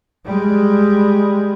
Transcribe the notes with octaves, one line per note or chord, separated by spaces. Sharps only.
G3 G#3